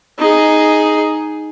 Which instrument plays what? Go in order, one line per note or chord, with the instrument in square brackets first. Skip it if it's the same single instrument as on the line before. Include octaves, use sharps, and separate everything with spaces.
[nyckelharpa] D#4 G#4